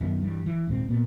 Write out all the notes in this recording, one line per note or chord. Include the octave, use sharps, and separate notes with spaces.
F#2 D#3 B3
G2 E3 G3
E3
D#1 G#2 G#3 C4
A#2 B3